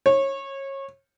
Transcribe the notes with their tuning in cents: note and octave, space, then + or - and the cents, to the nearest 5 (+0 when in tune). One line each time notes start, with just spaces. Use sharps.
C#5 -25